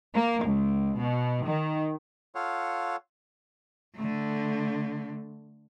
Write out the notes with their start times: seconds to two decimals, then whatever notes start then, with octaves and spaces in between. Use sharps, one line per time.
0.14 A#3
0.45 C#2
0.97 B2
1.44 D#3
2.35 F4 A4 C#5 F5 F#5
3.95 D3 A3